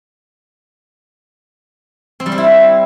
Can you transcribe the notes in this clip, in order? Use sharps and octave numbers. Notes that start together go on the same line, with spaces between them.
C4
G3
C4
E4